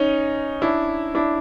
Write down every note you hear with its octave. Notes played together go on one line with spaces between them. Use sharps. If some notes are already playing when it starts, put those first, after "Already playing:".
Already playing: C#4 D#4
D4 E4
D4 E4